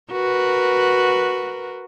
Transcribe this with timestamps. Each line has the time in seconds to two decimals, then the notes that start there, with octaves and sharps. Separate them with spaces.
0.12 F#4 A#4 B4